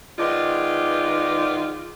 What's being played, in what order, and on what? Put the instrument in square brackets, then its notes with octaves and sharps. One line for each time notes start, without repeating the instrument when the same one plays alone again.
[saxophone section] D#3 G#3 B3 D#4 F4 D5